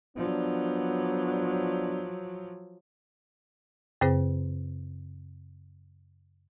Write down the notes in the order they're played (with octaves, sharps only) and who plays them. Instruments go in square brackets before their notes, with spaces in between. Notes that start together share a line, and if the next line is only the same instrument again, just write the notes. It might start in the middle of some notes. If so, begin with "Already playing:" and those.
[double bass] F3 F#3 [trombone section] B3 D4
[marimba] F#2 C#3 C4 G#4 C5